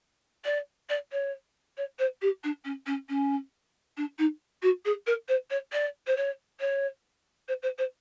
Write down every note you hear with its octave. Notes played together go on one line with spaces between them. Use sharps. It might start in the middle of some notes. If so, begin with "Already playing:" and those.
D5
D5
C#5
C#5
C5
G4
D4
C#4
C#4
C#4
D4
D#4
F#4
G#4
A#4
C5
C#5
D5
C5
C#5
C#5
C5
C5
C5